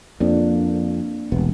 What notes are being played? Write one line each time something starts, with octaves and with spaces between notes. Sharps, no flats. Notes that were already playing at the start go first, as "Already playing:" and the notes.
F2 A#3 D4
E1 C2 B3